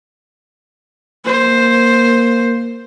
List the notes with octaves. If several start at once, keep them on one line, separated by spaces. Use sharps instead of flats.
A#3 C5